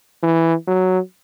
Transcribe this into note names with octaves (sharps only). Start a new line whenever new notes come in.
E3
F#3